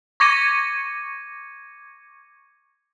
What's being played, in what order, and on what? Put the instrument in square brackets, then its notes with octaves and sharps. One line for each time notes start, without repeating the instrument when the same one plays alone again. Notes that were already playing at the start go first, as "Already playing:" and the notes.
[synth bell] C#6 D6 G#6 A#6 C#7 D#7